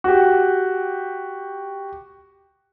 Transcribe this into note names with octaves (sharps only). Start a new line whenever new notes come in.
F#4 G4